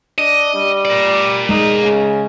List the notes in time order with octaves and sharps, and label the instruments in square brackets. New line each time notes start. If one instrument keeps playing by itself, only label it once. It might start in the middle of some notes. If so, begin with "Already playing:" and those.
[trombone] D4 [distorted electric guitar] D#5
[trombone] G3
[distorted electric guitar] A#4 D5
[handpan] G#3 [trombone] D#4
[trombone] C#3